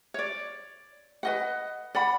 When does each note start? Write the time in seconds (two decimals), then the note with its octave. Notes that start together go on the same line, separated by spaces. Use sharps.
0.14 C#5 D5
1.23 B4 D#5 F#5
1.95 D5 F#5 B5